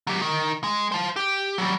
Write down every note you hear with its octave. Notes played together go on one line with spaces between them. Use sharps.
F#3 G4
D#3
G#3
C5 A5
G4
F#3 G3